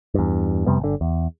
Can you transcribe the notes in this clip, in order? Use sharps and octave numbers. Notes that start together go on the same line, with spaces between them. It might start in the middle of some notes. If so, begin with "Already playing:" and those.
E2 G2
F2 C3 G3 B3
G1 D3
E2